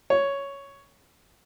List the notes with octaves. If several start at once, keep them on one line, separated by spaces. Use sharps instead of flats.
C#5